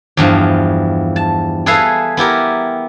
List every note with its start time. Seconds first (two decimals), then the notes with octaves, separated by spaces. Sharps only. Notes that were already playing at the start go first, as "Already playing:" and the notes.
0.17 E2 G2 F3
1.16 A5
1.66 G#4 A4 B4 E5 F5 G#5
2.17 B3 E4 G4 A#4